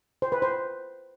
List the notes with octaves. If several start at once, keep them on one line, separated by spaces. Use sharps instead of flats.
C5
B4
C5